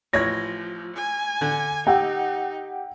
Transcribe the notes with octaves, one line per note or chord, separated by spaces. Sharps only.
A1 F3 C#5 G#6 A#6
G#5
D3
D#4 G4 F#5 G5 E6